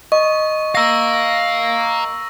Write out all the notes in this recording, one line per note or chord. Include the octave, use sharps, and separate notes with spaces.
D#5 C#6
F5 A#5 E6 A#6